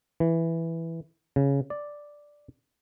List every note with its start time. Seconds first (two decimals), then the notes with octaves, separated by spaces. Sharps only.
0.20 E3
1.36 C#3
1.70 D5